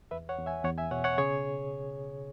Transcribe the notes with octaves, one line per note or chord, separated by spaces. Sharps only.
E2 B4 E5
C#5 F#5
E2
E5 G#5
E2 C#5 F#5
E5 G#5
B2 C#5 F#5
C#5 F#5
C#3 G#4 C#5